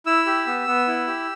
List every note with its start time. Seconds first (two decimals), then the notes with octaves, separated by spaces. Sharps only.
0.06 E4 E6
0.26 G4
0.47 B3
0.67 B3
0.88 E4
1.07 G4